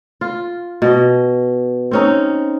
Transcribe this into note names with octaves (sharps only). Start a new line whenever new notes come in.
F4
B2 D#5
C4 C#4 D#4